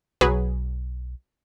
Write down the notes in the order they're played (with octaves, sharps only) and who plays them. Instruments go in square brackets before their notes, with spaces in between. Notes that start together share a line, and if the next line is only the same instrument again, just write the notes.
[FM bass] B1 [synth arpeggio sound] F#3 G#4 B4